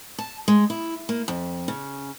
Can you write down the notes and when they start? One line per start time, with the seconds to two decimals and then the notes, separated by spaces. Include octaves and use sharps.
0.18 A5
0.48 G#3
0.70 E4
1.09 A#3
1.28 F2
1.68 C#3